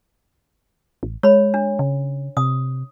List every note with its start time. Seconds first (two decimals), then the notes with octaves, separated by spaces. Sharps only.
1.03 A1
1.23 G#3 C#5 B5
1.54 D4
1.79 C#3
2.37 C3 D#6